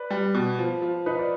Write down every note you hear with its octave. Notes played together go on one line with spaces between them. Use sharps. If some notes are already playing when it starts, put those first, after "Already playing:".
Already playing: B4 D5
G3
B2
F3
F3
D#4 B4
D5